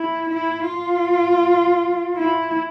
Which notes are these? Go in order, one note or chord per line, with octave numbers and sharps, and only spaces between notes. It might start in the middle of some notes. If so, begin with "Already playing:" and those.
Already playing: E4
E4
F4
E4